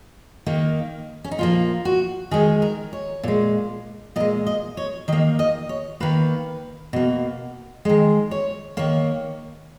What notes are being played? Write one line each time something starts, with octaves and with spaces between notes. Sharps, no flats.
D#3 A#3
C#4
D#4
A#2 F3 A#3 F4
F#4
D#3 G#3 G#4
A#4
C#5
A#2 G#3
A#2 G#3 D#5
D#5
C#5
D#3 A#3 D#5
D#5
C#5
D#3 A#3 B4
B2 A#3
D#3 G#3 D#5
C#5
D#3 A#3 C#5